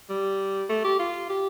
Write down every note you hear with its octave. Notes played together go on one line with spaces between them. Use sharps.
G3
A3
G4
F4
G4